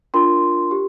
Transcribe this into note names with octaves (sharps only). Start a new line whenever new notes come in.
D4 F4 A#4 C6
G4